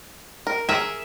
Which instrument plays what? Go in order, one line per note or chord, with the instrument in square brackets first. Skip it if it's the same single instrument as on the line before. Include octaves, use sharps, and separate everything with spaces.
[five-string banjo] A#4
[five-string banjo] G#4 A#4 [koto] E5